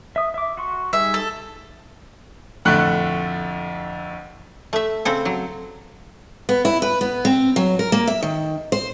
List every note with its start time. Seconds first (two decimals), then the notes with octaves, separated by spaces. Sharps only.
0.16 E5 D#6
0.34 E5 D6
0.57 F#4 C6 C#6
0.93 G3 D#4 G#4 E5
1.14 A4
2.65 F2 A2 D3 A3 F#6
4.73 A3 E5
5.05 C#3 C4 A4
5.25 F#3
6.49 B3
6.65 E4
6.82 B4
7.01 B3
7.25 C4
7.56 F#3
7.79 A#4
7.92 A#3
8.07 E5
8.23 D#3
8.72 C5